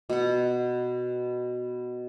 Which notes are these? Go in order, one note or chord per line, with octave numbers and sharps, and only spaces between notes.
B2 F#5